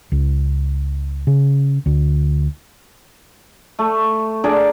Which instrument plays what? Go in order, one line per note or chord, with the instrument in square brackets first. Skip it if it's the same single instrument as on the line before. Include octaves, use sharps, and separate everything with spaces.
[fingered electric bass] C#2
C#3
D2
[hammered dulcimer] A3
D4 G#4 A#4 D5